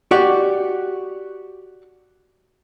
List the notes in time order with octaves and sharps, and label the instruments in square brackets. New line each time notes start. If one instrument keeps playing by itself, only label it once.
[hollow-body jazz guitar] F#4 G4 D5